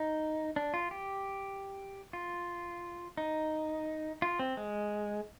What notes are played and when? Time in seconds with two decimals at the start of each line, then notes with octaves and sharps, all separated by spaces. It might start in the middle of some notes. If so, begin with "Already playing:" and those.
Already playing: D#4
0.56 D4
0.74 F4
0.91 G4
2.13 F4
3.17 D#4
4.22 F4
4.39 C4
4.57 G#3